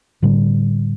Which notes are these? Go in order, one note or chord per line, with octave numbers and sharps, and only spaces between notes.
A2 D3 G3